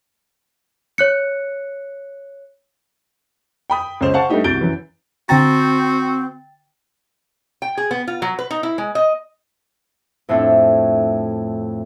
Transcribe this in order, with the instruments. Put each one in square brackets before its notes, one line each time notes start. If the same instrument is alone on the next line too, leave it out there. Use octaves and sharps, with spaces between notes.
[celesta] C#5 F#6 C#7
[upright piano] G5 B5 D#6
C#2 C#4 C5 E7
C5 F5 F#5 A5 C#6
G3 A3 B3 D4 D#4 G4
C2 F#4 G6 A6 D7 G7
F#2 E3
[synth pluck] D3 A#5 [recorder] C4 [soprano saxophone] F#4 [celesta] G5 A6
[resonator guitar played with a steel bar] G5
G#4
B3
F4
F#3
B4
D#4
E4
G#3
D#5
[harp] F2 A2 A3 C4 D4